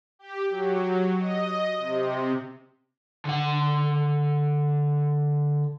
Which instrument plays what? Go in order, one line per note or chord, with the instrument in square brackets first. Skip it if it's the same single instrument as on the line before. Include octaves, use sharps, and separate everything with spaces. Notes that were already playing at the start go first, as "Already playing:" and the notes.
[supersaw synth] G4
F#3
D#5
C3
[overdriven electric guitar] D3 F#5